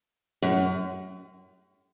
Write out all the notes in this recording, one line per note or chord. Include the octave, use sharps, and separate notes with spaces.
F#2